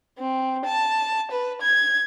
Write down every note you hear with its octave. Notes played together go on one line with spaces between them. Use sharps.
C4
A5
B4
G#6